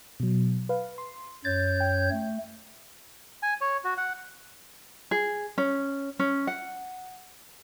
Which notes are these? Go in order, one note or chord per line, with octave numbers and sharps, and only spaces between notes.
B2 F#3
B4 F5
C6
F#2 C#5 G6 A6
G5
A3
G#5
C#5
F#4
F#5
G#4
C#4
C#4
F#5